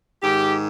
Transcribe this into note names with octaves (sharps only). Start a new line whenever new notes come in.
G#2 D#3 G4